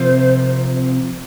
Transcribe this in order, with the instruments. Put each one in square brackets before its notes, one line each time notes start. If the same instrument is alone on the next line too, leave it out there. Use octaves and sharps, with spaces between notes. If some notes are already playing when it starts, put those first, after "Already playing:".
Already playing: [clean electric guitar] C3 F3 C4 F4 A#4 [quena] C5